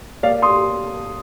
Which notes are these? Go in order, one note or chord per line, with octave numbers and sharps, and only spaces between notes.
A#3 D5 F5
C6 D#6